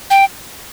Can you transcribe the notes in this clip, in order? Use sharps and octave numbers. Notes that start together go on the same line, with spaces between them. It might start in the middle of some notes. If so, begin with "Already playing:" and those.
G5